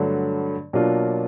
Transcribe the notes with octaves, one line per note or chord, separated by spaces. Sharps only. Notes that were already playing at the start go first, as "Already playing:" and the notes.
Already playing: G2 D3 F#3 A3
B2 F#3 A#3 D4 F4